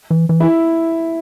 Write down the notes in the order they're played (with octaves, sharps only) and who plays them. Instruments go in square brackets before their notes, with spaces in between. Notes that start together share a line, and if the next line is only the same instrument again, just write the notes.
[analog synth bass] E3
E3
[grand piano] E4